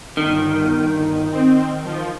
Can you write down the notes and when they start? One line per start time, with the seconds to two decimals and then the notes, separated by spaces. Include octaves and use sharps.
0.17 G1 D#3
1.32 C4
1.85 F3